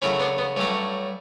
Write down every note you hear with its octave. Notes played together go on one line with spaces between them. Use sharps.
F#2 C#3 F#3 A3 C#4 E4
B3 D4
B3
G2 F#3 A3 C#4